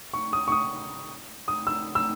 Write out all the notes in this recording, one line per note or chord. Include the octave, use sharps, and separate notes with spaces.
C#6
D#6
C#6
D#6
D#6
E6
E6